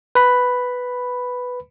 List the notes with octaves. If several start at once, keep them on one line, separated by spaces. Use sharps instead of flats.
B4 B5